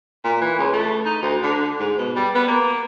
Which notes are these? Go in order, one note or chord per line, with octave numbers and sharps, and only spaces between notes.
A#2
E3
C#2
A3
D#4
D2
D3
G#2
B2
G3
B3
A#3